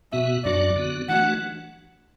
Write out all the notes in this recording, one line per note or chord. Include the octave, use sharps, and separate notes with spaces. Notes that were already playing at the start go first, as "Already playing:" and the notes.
B2 B3 F#4 E5
F#2 F#3 D4 F#4 D5
D3 B3 F#4
E3 A3 D4 F#4 F#5